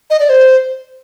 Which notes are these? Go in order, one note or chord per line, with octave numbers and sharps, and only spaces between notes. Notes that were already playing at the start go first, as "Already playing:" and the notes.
D#5
D5
C5